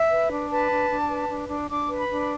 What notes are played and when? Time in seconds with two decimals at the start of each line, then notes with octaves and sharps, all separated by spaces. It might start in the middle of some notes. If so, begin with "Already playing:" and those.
Already playing: E5
0.11 B4
0.31 D4
0.50 B4 A5
0.71 D4
0.90 D4
1.09 B4
1.29 D4
1.49 D4
1.68 D4 D6
1.88 B4
1.99 B5
2.08 D4
2.22 B5